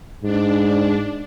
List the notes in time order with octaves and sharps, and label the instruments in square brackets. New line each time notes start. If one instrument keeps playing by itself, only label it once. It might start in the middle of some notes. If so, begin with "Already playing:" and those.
[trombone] G#2 [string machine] D4